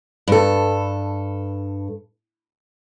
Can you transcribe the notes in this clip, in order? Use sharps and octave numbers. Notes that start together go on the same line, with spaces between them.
G2 A4